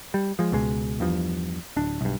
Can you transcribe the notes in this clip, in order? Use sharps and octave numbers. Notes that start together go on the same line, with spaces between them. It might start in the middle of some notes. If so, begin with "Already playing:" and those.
G3
F3 G#3
C#2 B2 G#3
E2 G2 F3
D1 D4
B1 G2